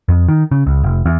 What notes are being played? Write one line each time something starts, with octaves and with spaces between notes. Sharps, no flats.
F2
D#3
C#3
C#2
F1
E2